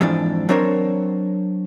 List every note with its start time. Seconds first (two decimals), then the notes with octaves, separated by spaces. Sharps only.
0.01 F2 G#2 E3 F3 D4
0.49 F#3 C4 D4 A#4 C5 C#5